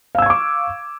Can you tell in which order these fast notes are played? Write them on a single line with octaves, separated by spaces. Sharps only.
F5 E6 G#6 C#6 D6